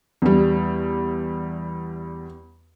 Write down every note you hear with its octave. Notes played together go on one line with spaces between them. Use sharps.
E2 G3